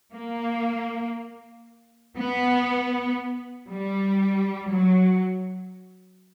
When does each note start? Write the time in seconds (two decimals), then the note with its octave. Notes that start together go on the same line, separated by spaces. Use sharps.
0.14 A#3
2.17 B3
3.70 G3
4.71 F#3